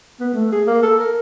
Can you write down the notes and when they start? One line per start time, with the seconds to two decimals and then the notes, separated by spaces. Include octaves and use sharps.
0.20 B3
0.34 A3
0.52 G#4
0.67 A#3
0.82 A4
0.99 A#4